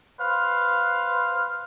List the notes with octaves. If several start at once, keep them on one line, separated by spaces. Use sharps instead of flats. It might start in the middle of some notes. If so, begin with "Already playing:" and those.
B4 C5 F5